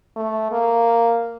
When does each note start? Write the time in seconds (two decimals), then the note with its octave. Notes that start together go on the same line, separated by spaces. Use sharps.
0.16 A3
0.52 A#3